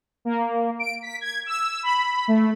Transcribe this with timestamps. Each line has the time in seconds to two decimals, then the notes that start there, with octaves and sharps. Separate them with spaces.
0.25 A#3
0.79 D7
1.02 B6
1.21 G#6
1.46 E6
1.83 B5
2.28 A3